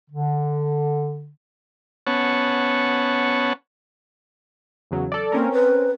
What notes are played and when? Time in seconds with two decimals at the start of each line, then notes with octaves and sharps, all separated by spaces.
0.10 D3
2.07 B3 C#4 C#5 F#5 A5
4.91 E2 C#3 F#3
5.12 A4 D5
5.32 A#3 C4 C#4 A#4
5.52 B4